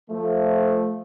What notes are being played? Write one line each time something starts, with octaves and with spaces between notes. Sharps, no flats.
F3 A3